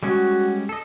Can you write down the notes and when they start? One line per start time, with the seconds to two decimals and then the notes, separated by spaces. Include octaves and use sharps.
0.03 G3 G#3 C#4 F#4
0.69 A4 D#5